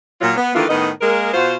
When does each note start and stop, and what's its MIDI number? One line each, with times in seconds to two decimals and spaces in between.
0.21 0.36 46
0.21 0.36 54
0.21 0.36 65
0.36 0.50 59
0.55 0.65 51
0.55 0.65 52
0.55 0.65 57
0.55 0.65 58
0.55 0.65 62
0.55 0.65 65
0.69 0.89 45
0.69 0.89 51
0.69 0.89 59
0.69 0.89 75
1.01 1.32 56
1.01 1.32 58
1.01 1.32 70
1.34 1.56 47
1.34 1.56 65
1.34 1.56 66
1.34 1.56 72